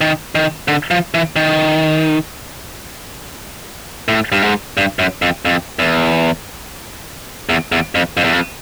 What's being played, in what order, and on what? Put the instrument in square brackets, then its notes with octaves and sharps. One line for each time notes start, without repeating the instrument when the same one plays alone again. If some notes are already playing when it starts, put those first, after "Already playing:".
[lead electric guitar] D#3
D#3
D3
F3
E3
D#3
A2
G2
G#2
G2
F#2
F2
F2
E2
E2
E2
F2
F2
E2
F2